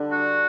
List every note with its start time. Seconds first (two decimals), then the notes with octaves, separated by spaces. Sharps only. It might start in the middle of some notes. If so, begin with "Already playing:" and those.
Already playing: D3 G3 D4
0.11 F#4